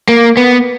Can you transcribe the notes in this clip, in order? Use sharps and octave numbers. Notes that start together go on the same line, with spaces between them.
A#3
B3